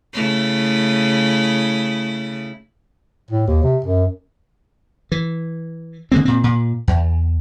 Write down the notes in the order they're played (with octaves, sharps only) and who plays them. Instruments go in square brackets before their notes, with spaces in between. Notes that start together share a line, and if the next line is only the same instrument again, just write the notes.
[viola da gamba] C#3 A3 E4
[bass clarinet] A2
D#2
C3
F#2
[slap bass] E3
D3 G#3 A#3 C4
A#2 C4
A#2
E2